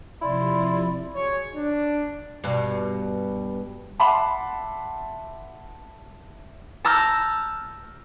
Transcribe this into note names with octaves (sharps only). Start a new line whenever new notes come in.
C3 F3 E4 D5 C6
F#3 G#4 C#5
D4
G2 B2
E5 F#5 A5 B5 C6 D6
A5 A#5 E6 F6 G6